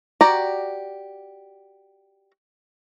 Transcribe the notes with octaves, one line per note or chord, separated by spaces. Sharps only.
F#4 G4 D5 A#5